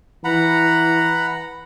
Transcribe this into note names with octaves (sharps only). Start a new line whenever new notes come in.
E3 F#5 A#5 B5